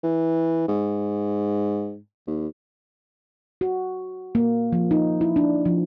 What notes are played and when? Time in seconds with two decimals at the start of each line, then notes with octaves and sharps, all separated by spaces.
0.03 E3
0.68 G#2
2.27 D#2
3.61 F#4
4.35 A#3
4.72 F3
4.91 D#4
5.21 E4
5.36 D4
5.65 F3